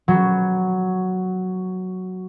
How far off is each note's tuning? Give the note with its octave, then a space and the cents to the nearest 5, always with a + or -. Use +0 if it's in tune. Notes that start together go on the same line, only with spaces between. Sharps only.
F#3 +0 B3 +0